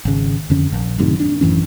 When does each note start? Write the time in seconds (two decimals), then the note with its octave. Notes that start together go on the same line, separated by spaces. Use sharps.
0.05 G#1 C#3
0.50 F2 D3 C#4
0.72 A#1
0.98 F#2 A2 C3 D#3
1.20 D4
1.41 A1 F#2 E3 C#4